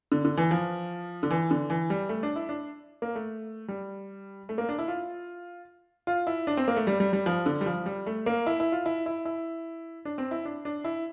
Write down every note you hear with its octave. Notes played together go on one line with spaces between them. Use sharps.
D3
D3
E3
F3
D3
E3
D3
E3
G3
A3
D4
E4
D4
A#3
A3
G3
A3
A#3
D4
E4
F4
F4
E4
D4
C4
A#3
A3
G3
G3
G3
F3
D3
G3
F3
G3
A3
A#3
E4
E4
F4
E4
E4
E4
D4
C4
E4
D4
D4
E4